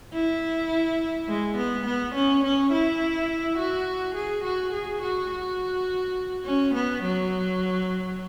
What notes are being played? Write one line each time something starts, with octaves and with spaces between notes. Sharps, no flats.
E4
G#3
B3
B3
C#4
C#4
E4
F#4
G#4
F#4
G#4
F#4
F#4
C#4
B3
F#3